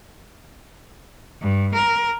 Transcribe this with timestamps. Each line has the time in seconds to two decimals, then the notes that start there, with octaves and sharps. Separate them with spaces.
1.40 G2
1.73 A#4